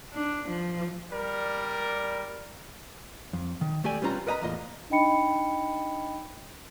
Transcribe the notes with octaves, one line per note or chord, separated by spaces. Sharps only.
D4
F3
G3 A#4 D5
F2
D#3
D2 A3 G4 D5 G#5
G3 B3 C#4 F4 A#5
A#4 B4 D#5 F#5 A#5 B5
E2 A2 A#3 F4 D#5
D4 D#4 D#5 G5 B5 C#7